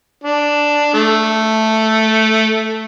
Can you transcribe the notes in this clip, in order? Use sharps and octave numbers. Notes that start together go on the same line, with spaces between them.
D4
A3